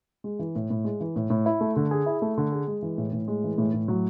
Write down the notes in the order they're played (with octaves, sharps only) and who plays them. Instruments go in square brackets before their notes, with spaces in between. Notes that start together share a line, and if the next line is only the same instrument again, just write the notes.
[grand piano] G#3
E3
A2
A2
G#3
E3
A2
A2
E4
A3
D3
G#4
E4
A3
D3
G#4
G#3
E3
A2
A2
G#3
E3
A2
A2
F#3